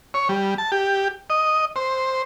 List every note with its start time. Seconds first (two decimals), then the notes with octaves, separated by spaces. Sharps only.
0.14 C#5
0.29 G3
0.58 A5
0.72 G4
1.30 D#5
1.76 C5